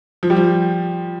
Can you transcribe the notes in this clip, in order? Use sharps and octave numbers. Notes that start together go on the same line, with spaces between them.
F3
G3
F3